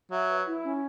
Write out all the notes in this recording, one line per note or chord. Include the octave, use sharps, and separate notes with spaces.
F#3 E5
B4
E4
C#4